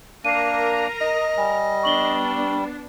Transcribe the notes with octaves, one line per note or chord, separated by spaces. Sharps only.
A#3 D4 A#4 A#5 C7 D#7
D#5 D#6
G3 G#5
B3 D4 C#6 F#7 G7